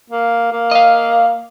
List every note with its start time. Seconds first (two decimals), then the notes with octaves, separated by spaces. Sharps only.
0.10 A#3
0.52 A#3
0.71 D#5 F5